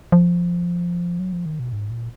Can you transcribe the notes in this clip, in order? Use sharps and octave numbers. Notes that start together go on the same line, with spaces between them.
F3
F#3
F3
D#3
B2
G#2
A#2